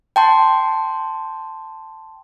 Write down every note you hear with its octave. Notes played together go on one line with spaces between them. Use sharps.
G5 A5 C6